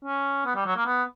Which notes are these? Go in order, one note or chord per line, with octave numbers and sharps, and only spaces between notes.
C#4
B3
G3
F#3
A#3
B3